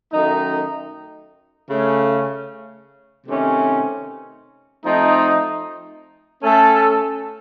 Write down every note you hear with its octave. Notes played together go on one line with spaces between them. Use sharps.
F#2 D#3 A3 D#4
C#3 A3 C#4
C3 D#3 A3 C#4
F3 A3 C4 D#4
A3 C#4 A4